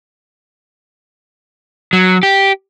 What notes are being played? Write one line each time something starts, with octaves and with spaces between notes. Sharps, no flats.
F#3
G4